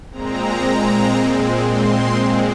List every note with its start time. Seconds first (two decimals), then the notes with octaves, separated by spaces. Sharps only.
0.11 A#2 G#3 C4 A#5
1.62 C6